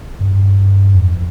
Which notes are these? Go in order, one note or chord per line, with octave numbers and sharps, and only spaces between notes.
G2
F2